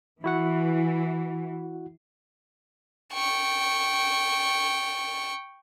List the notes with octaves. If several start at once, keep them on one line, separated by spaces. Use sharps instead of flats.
E3 E4 F#4 F#5
G5 C#6